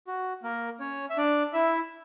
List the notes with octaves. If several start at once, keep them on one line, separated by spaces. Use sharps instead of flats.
F#4
A#3 A#4
C#4 C#5
E5
D4 D5
E4 E5